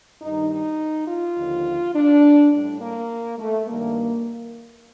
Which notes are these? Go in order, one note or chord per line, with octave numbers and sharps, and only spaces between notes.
G2 D#3 G3 D#4
D#4
F4
D#2 D3 F3
D4
A2 G3 D4
A#3
A3
G2 D#3 G3 A#3